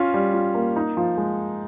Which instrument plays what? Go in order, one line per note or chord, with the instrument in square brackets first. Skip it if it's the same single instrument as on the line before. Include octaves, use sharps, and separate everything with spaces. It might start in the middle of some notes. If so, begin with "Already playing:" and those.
Already playing: [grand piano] C#4 F4
G3
F4
A#3
D#4
F3
G#3